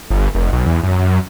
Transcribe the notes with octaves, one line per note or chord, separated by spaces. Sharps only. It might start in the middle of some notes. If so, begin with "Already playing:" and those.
G1
F1
B1
E2
F#2